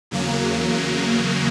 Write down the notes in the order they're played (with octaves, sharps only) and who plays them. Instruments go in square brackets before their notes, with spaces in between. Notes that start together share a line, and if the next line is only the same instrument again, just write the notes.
[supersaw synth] E2 C#3 F#3 A#3